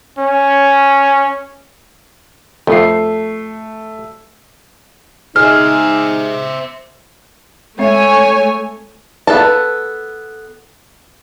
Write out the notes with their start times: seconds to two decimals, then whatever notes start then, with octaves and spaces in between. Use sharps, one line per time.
0.18 C#4
2.67 F2 A3 C7
5.36 G#3 D#4 C5 E5 F6
7.79 G#3 A3 C4 C#5 E5 G#5
9.27 B3 A4 A5